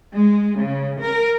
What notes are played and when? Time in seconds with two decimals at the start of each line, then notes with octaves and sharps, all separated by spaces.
0.15 G#3
0.59 C#3
1.02 A#4